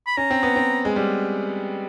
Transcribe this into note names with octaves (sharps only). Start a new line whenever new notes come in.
B5
C#4 A#5
C4
B3
C4
G#3
G3